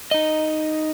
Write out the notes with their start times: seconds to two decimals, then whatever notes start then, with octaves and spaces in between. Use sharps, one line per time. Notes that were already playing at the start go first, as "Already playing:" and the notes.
0.11 D#4 D#5